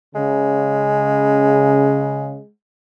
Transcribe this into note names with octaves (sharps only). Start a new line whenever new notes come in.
C#3 G#3